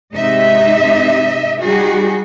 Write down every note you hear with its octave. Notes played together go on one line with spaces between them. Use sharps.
G#2 C3 D#4 D#5 E5
G3 D#4 F#4 G#4